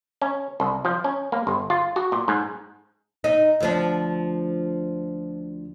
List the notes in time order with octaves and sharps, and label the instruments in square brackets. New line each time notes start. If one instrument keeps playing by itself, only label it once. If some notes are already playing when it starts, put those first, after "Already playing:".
[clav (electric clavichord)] C#4
C2
F3
C#4
A#3
G1
F4
F#4
A#2
G#2
[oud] D#4
D2 F3 D4